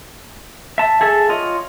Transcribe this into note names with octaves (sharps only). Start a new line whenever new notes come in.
E5 A5
G#4 A4 E5
F4 C#5 D#5